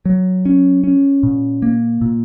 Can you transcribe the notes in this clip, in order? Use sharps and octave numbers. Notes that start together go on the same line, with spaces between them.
F#3
C#4
C#4
A#2
A#3
A#2